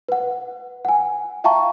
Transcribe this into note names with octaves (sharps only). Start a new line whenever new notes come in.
B4 F#5
F#5 G#5
E5 F5 G5 A5 A#5 C#6